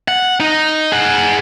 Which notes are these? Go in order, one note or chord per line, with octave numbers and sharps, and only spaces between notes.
F#5
D#4
G#4 F#5